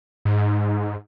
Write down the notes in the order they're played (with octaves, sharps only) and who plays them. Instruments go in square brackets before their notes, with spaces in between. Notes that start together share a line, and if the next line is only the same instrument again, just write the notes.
[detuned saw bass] G#2